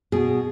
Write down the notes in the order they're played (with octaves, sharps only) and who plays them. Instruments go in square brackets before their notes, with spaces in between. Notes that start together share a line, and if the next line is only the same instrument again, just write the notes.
[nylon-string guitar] B2 G#4